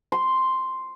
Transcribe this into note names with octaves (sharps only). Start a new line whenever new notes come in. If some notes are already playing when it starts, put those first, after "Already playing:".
C6